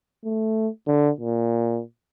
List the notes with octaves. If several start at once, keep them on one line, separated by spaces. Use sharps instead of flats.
A3
D3
A#2